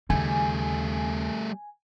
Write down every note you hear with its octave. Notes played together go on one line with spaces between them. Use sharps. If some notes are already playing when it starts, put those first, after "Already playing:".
D#2 C#3 G3 A3 G#5